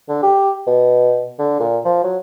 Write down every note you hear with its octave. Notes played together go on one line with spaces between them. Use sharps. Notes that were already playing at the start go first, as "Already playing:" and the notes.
D3
G4
B2
D3
A#2
F3
F#3